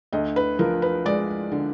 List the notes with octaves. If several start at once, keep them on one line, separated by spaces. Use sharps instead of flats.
D2 D#5
B4
F3 A#4
B4
G#3 D5
D3